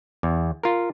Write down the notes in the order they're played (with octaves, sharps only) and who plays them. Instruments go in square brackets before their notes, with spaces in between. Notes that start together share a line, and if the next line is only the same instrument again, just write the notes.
[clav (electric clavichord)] E2
F4 A#4